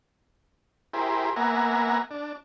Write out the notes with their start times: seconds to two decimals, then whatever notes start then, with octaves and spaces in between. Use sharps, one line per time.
0.93 E4 G4 G#4 A#4 C5
1.36 A#3 B3 E5 F#5 G#5 A#5
2.11 D4